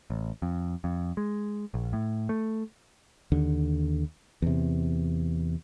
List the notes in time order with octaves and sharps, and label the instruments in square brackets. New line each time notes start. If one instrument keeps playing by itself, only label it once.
[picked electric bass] A1
F2
F2
G#3
A#1
A2
A3
[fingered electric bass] D#2 D3
E2 C3